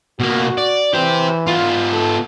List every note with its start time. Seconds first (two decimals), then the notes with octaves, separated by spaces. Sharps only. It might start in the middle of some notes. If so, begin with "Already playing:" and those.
0.20 B2 A#3 F#4
0.58 D5
0.94 E3 G4 C5
1.46 B3 F4
1.93 A4